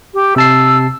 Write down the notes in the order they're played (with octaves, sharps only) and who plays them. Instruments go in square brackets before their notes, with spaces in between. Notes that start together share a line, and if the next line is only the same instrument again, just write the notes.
[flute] G4
[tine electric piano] C3 A5 C7 [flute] E6